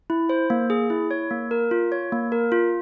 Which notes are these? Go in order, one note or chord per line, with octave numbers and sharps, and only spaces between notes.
E4
C5
A#3
G#4
E4
C#5
A#3
A#4
F4
C#5
A#3
A#4
F4